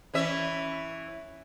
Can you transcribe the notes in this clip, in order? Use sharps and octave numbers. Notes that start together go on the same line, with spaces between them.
E3 C#4 E5